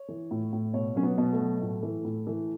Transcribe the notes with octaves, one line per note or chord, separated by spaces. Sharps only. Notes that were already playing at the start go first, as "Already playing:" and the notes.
Already playing: C#5
E3
A2
A2
B2 C#5
F#3 C#4
B3
B2
A3
F#3
A2
E3
A2
E3